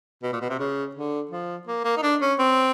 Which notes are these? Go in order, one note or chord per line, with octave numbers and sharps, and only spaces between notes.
B2
A#2
B2
C3
C#3
D3
F3
A#3
A#3
D#4
D4
C#4
C4